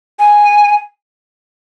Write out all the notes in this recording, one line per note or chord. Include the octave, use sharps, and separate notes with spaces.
G#5